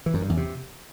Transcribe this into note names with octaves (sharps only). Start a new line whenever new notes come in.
E3
F#2
G2
E2
C3